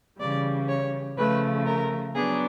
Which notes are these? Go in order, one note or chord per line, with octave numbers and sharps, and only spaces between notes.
C#3 E3 G3 D5
C#5
C#3 F3 A3 B4
A#4
F#3 B3 D4 G#4